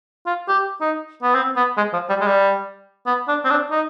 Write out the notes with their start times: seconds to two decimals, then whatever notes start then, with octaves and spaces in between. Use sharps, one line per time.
0.27 F4
0.48 G4
0.81 D#4
1.23 B3
1.35 C4
1.56 B3
1.77 G#3
1.93 F3
2.09 G3
2.21 G#3
2.27 G3
3.07 B3
3.28 D4
3.45 C4
3.50 D4
3.71 D#4